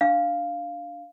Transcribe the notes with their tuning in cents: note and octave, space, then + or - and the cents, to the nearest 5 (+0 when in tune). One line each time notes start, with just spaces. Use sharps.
D4 +0 F5 +0